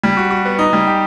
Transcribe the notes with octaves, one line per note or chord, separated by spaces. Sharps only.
G3
F#4
F#4
B3
D#4
G3
G4